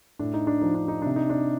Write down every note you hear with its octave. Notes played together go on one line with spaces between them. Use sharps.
A2 D4
D#4
D4
F3 D#4
D4
D#4
C3 D4
D#4
D4